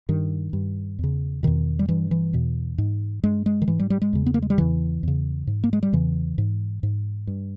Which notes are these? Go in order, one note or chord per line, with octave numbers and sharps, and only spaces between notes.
G2 D#3
G2
E2 C#3
E2 B2 D#3
G3
G2 E3
E3
E2 B2
G#2
G2 G#3
G#3
D#3
G#2 E3
G3
G3
G#3
E2 C#3
B3
A#3
G#3
G3
E2 C#3 E3
E2 C#3
G#2
A#3
G#3
G3
E2 C#3 E3
G#2
G#2
G2